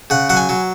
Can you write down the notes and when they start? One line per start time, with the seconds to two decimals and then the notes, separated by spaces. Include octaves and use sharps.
0.10 C#3 F#5
0.30 F#3 F#5
0.37 G#5
0.49 F#3